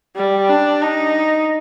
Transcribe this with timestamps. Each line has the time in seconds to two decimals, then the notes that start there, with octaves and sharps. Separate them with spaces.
0.16 G3
0.49 D4
0.82 D#4